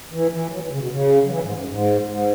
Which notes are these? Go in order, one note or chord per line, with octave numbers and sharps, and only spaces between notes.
E3
E3
F#3
E3
C#3
B2
C#3
F#3
E3
G#2
F#2
G#2
G#2